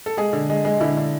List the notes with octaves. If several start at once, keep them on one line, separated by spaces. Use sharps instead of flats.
A4
G#3 G#4
D3
G#3
G#3
D3 E4
D3